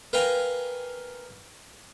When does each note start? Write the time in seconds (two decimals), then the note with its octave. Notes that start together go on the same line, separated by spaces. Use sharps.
0.13 A#4 B4 F5 G5 G#5 A#5